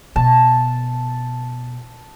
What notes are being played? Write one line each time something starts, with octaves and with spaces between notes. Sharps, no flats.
B2 A5